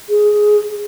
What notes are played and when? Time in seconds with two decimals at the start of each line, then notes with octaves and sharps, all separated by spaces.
0.09 G#4